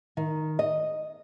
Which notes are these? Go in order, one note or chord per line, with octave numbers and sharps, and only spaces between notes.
D#3
D#5